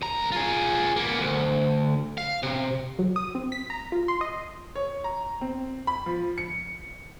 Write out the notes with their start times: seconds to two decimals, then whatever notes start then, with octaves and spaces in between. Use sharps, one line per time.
0.02 C2 A#5
0.32 F4 G#4
0.96 A#3 B3
1.20 D2
2.18 F5
2.43 C3
2.99 F#3
3.16 D#6
3.35 C4
3.52 B6
3.70 A#5
3.92 F4
4.08 C6
4.21 D#5
4.76 C#5
5.04 A#5
5.41 C4
5.87 B5
6.06 F3
6.38 C#7